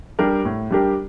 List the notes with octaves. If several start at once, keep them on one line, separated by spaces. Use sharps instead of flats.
G3 D4 G4 A#4
A2
G3 D4 G4 A#4